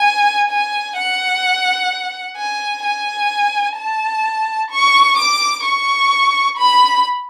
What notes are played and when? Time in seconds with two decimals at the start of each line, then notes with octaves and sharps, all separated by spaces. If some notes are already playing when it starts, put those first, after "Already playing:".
Already playing: G#5
0.50 G#5
0.97 F#5
2.37 G#5
2.84 G#5
3.77 A5
4.71 C#6
5.18 D6
5.65 C#6
6.58 B5